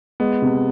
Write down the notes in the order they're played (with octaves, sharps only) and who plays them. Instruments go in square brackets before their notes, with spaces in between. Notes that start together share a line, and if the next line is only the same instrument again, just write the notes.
[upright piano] G#3 [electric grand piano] B3
[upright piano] C3